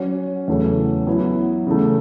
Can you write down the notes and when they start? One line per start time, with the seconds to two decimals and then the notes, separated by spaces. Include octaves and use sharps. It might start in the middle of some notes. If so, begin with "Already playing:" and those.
Already playing: F#3 C#4 F#4 C#5
0.48 E2 C#3 F#3 A3 C#4
1.07 F#3 B3 E4
1.67 C#3 E3 A3